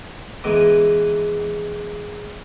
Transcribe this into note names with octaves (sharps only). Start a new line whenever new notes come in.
G#2 E3 G#3 B3 D6